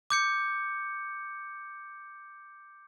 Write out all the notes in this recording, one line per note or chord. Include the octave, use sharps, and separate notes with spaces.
D6 G6 C#7